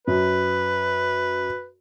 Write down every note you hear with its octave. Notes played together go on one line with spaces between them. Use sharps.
F#2 B4